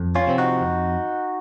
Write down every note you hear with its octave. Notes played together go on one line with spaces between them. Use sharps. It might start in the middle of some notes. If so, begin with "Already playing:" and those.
Already playing: F2
C#4 F4
C3 F3 C4
D#4 F#4
F2